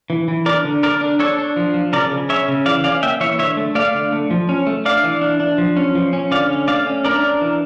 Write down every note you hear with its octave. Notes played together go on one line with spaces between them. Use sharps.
E3
E3
D4 A#4 D5
D3
D3 A#4 D5
D4
D4 A4 C#5
D4
F3
F3
C#3 A#4 D5
C#3
C#4 C#5 E5
C#3
E3 D5 F5
C#4 D5 F5
A#3 E5 G5
E3 C#5 E5
D3 C#5 E5
A3
A3 D5 F5
D3
A3
F3
C#4
A3
D4 D5 F5
E3
D4
D4
F3
C#4
F3
C#4
D3 D5 F5
C#4
A3 D5 F5
C#4
D4 A#4 D5
D4
E3